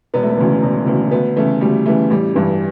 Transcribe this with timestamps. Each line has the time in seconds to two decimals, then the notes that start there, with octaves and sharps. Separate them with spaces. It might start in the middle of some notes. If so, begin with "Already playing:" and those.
0.14 E1 B3
0.23 A3
0.31 B3
0.37 D2 C#3 E3
0.62 E1
0.87 D2 C#3 E3
1.11 D2 B3
1.36 C#3 E3 A3
1.61 D2 G3
1.85 C#3 E3 A3
2.10 A1 G3
2.35 G2 E3